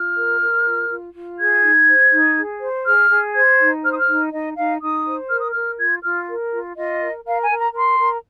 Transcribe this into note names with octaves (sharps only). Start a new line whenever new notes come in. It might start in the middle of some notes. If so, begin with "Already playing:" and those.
Already playing: F4 F6
A#4
A#4
F4
F4
F4
G#4 G#6
D#4
C5
D#4
G#4
C5
G#4 F6
G#4
C5 G#6
D#4
C5 F6
D#6
F6
D#4
D#4 D#5
D#4 F5
D#4 D#6
C5
A#4 F6
D#6
A#4 F6
F4 G#6
F4 F6
A#4
F4
F4 D#5
A#4
A#4 F5
G#5
A#4
A#5
A#4 C6
A#4